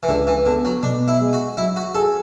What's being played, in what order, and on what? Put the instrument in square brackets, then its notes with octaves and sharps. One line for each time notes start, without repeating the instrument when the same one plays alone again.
[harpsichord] E3
[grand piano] C#2 [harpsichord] D3
[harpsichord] E3
[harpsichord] D3 [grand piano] B3
[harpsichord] F#3
[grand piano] B2 [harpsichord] D4
[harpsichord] E4
[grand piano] G#3
[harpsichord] F#4
[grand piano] F#3 [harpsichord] E4
[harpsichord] F#4
[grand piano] G#4 [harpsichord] A4